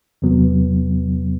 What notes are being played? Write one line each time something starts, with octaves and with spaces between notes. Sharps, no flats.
E2 C3 F#3 B3